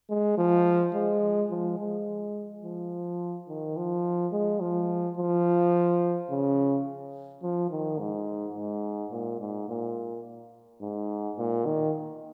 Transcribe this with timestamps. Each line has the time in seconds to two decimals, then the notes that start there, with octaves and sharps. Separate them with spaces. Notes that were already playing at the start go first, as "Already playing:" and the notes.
0.10 G#3
0.38 F3
0.94 G#3
1.50 F3
1.79 G#3
2.64 F3
3.48 D#3
3.76 F3
4.33 G#3
4.60 F3
5.17 F3
6.30 C#3
7.43 F3
7.70 D#3
7.99 G#2
8.56 G#2
9.12 A#2
9.40 G#2
9.69 A#2
10.81 G#2
11.38 A#2
11.65 D#3